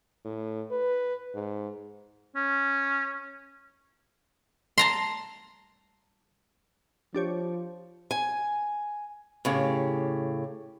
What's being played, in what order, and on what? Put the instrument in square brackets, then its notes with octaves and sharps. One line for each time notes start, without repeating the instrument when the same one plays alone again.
[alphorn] A2
B4
G#2
[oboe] C#4
[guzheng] A5 A#5 C6
[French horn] F3 [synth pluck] D4 G4 C#5
[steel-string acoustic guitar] G#5
A2 C#3 G4